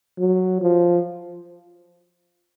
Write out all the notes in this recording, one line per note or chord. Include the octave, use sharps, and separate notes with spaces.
F#3
F3